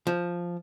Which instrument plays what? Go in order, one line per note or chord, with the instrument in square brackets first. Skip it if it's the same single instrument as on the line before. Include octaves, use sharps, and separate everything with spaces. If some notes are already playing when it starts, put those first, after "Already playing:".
[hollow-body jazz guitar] F3